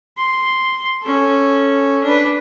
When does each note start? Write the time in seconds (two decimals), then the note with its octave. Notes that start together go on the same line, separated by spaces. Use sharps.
0.17 C6
1.02 C#4 A4
2.03 D4 B4